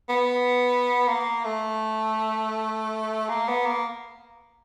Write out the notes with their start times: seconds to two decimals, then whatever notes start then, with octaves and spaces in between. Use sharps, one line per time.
0.09 B3
1.08 A#3
1.45 A3
3.29 A#3
3.48 B3
3.66 A#3